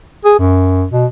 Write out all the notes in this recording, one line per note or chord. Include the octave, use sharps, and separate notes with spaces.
G#4
F#2
B2